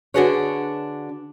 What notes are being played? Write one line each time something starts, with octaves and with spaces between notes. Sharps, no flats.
D3 D4 F#4 G#4 B4 C#5